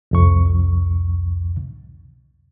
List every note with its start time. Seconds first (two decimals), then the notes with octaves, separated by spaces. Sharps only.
0.11 C2 F2 C#6